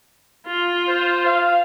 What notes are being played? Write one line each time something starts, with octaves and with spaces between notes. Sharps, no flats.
F4
C5
F5